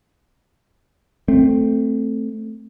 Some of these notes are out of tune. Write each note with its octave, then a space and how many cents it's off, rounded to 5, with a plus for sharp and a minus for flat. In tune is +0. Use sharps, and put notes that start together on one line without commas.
A3 +5 C4 +0